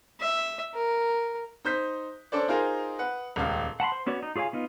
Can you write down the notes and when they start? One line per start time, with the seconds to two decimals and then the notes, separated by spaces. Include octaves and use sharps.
0.21 E5
0.75 A#4
1.65 D#4 C5 G6 B6
2.32 C#4 D4 A4 C5 D5
2.48 D#4 F4 G#4 A#4 C5
2.99 B4 F#5
3.36 D#1 C#2 F5
3.80 F#5 A5 B5 C6
3.92 C5
4.07 B3 C#4 F#4 C#5 D5
4.23 D#4
4.36 F4 G#4 C#5 F5 G#5
4.53 B3 D#4 F4